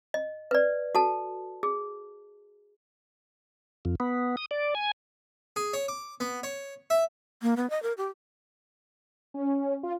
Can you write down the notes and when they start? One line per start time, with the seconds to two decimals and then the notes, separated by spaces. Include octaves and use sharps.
0.14 D#5
0.51 B4 D5
0.95 F#4 A4 A5
1.63 G#4
3.85 F2
4.00 B3
4.37 D#6
4.51 D5
4.75 G#5
5.56 G#4
5.73 C#5
5.88 D6
6.20 B3
6.43 C#5
6.90 E5
7.42 A#3
7.57 B3
7.70 D#5
7.82 A#4
7.97 G4
9.34 C#4
9.83 F4